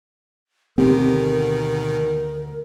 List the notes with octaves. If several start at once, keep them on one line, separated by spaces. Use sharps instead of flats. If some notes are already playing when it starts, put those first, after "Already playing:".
D2 B2 D#3 C4 G4 A#4 C5